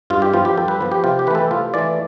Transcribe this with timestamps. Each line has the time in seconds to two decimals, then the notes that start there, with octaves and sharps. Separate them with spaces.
0.10 G2 F4
0.22 G4
0.33 F3 B3 F4
0.45 G4
0.57 G2 A4
0.68 B4
0.81 F3 B3
0.92 G4
1.04 C3 F4
1.19 G4
1.27 E3 B4
1.31 A3 A4
1.51 C3 F4
1.74 E3 A3 D5